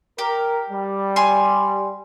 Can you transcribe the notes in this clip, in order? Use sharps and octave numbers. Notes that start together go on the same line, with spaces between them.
G4 A#4
G3
G#5 C6